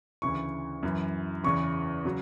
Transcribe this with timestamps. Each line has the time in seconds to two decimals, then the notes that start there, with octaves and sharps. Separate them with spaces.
0.22 D2 C#3 E3 C#6
0.83 F#2 E3
1.44 E2 C#3 E3 C#6
2.05 C#3 F#3